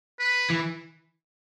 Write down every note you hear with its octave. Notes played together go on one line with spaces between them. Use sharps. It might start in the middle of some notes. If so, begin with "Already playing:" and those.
B4
E3